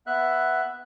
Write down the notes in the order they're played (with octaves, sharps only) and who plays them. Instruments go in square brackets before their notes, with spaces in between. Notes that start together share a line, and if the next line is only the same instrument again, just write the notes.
[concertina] B3 E5 F#6